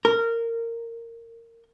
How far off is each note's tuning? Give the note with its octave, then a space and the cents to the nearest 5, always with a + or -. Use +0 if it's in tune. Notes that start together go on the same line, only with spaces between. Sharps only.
A#4 -15